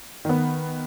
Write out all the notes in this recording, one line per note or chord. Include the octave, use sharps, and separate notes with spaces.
D#3 B3